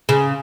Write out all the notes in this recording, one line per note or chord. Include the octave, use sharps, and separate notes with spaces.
C#3